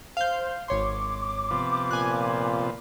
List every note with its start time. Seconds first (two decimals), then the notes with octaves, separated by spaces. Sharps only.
0.17 C5 F5 G6
0.68 G#1 C#5 C6 D6
1.50 C3 F3 B3
1.91 A#2 G#5 F#6